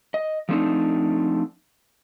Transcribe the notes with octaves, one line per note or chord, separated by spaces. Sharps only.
D#5
F3 A3 C4 D4 D#4